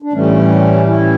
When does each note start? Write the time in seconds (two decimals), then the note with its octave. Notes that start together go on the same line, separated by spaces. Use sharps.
0.02 D4
0.13 A2 E3 G3 A3 C#4
0.87 C#4 E4